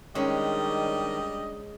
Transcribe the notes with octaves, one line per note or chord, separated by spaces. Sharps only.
D#3 G3 G#3 C#4 D4 D#5